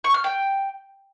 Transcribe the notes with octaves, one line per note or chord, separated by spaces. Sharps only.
C#6
F6
G5